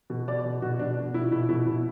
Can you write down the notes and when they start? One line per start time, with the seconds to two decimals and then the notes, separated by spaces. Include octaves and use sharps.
0.10 B2
0.28 B2 D5
0.45 B2
0.62 B2 F#4
0.79 B2 D4
0.97 B2 D4
1.14 B2 E4
1.32 B2 E4
1.49 B2 E4
1.66 B2 E4